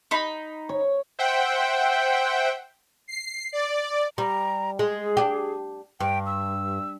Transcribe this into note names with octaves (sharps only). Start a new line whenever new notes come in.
D#4 B5
C#5
C5 E5 F#5 G5
C7
D5
G3 A#5
G#3 G#4
D4 G4
G2 G5
E6